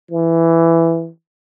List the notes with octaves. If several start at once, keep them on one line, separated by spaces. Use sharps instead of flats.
E3